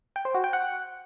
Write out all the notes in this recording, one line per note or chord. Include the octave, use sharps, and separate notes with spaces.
G5
C5
F#4
G5
F#5